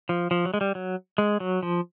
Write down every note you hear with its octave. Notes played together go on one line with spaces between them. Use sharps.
F3
F3
F#3
G#3
G3
F#3
G#3
F#3
F3